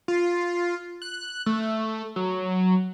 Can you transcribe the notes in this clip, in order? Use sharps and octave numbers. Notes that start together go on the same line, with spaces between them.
F4
F#6
A3
F#3